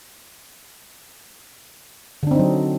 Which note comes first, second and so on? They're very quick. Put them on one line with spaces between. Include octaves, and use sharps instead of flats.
D3 D4 C4 D#4 F#3